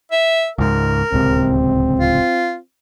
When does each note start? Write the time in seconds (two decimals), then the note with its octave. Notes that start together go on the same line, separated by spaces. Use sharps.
0.12 E5
0.58 C#2 G#2 A#4
1.12 D1 C#2 C3 C4
2.00 F4